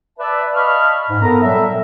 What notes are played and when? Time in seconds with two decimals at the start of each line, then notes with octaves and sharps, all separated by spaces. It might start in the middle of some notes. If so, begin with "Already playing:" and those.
0.19 B4 D5 E5 A5
0.55 D#5 F5 A5 B5 C#6 F6
1.10 G#2
1.22 B3 A4 A#4 A#5
1.42 A#2 F#3 G3 A4 E5